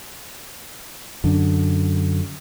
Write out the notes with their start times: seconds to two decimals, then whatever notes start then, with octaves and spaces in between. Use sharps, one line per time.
1.24 F#2 D3